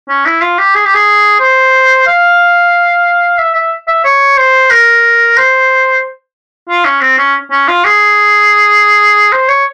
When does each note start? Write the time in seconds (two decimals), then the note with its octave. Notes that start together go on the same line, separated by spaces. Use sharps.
0.09 C#4
0.26 E4
0.41 F4
0.58 G4
0.75 G#4
0.85 G4
0.94 G#4
1.40 C5
2.07 F5
3.39 E5
3.55 E5
3.88 E5
4.04 C#5
4.37 C5
4.71 A#4
5.37 C5
6.69 F4
6.85 C#4
7.01 C4
7.18 C#4
7.51 C#4
7.68 F4
7.85 G#4
9.32 C5
9.48 C#5